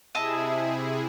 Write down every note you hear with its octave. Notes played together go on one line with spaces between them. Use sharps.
C3 E4 G#4 D#5 E5 A5